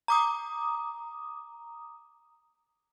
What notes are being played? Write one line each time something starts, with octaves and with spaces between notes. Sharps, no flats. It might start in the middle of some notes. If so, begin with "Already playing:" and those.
A#5 D6 D#6